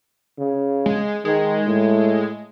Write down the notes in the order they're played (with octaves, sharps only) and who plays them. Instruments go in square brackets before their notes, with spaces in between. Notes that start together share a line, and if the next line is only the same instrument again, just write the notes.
[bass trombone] C#3
[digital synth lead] G#3
[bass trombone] D#3 [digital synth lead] G#3
[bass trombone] A2